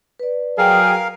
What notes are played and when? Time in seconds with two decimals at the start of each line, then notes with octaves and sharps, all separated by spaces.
0.19 B4 D5
0.58 F#3 G#4 A#4 F5 G5